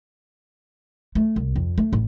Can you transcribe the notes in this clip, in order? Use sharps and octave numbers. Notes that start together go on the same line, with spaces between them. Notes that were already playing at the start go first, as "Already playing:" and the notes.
A3
C2
F2
A3
A1